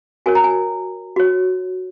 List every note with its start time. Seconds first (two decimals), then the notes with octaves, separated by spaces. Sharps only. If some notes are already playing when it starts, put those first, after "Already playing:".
0.26 F#4 A#4 C#5 G#5
0.35 A#5
0.44 G#5
1.16 F#4 C#5